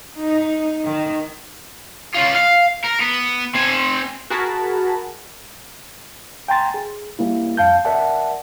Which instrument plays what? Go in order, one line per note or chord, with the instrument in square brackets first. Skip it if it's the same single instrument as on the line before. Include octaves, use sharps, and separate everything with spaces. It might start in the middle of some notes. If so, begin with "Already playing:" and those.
[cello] D#4
D#3
[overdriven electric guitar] C#4 F4
F5
A#4
B3
C4 G#5
[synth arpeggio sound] F#4 G#4 A#4 A5 B5
[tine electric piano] G5 G#5 A#5 C6 A6
G#4
G3 A#3 E4
F2 F5 A5 G6
A#4 D5 E5 F#5 A5